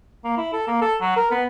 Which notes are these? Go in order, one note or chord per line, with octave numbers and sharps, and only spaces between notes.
A#3
E4
A4
A#3
A4
F#3
A#4
B3